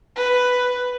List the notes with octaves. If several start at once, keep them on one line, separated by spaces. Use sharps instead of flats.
B4